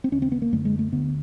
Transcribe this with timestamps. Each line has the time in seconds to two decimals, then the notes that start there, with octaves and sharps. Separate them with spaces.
0.04 C4
0.12 D#2 C#4
0.17 C#3
0.22 C4
0.32 B3
0.42 A#3
0.53 F#2 D3 A3
0.65 G#3
0.79 A3
0.92 D2 D3 B3